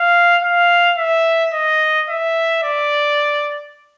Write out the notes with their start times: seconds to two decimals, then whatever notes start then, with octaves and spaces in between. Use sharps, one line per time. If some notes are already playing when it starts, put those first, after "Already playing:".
Already playing: F5
0.43 F5
0.98 E5
1.54 D#5
2.09 E5
2.63 D5